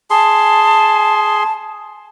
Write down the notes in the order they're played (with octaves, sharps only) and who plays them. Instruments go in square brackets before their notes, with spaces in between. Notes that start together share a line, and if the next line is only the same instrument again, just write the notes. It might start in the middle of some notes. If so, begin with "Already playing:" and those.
[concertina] G#4 C6 [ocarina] A5